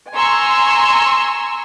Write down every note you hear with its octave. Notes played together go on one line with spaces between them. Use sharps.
G#5 A#5 C6 C#6 E6